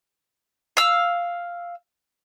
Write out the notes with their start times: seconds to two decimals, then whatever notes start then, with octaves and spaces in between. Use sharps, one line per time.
0.77 F5 E6